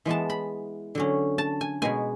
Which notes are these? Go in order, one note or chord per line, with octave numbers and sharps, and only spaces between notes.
E3 G#3 B3 A5
B5
D3 F#3 C#4
A5
G#5
B2 G#3 B3 G#5